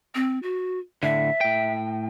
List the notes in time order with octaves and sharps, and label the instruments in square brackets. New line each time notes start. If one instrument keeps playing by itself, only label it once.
[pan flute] C4
F#4
[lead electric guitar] A2 D3 [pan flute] E5
[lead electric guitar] A2 G5